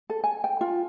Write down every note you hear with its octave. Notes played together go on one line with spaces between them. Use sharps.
A4
G#5
G5
F4